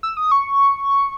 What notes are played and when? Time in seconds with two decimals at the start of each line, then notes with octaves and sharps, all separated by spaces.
0.03 E6
0.17 D#6
0.31 C#6